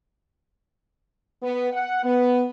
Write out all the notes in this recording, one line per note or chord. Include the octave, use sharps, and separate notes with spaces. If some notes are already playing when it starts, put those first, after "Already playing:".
B3
F#5
B3